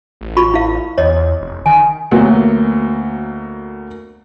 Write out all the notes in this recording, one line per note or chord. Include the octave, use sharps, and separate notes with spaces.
A1
F4 B5 C#6
E4 F5
E2 C#5 D#5
F1
D#3 G#5
D2 F#3 A#3 B3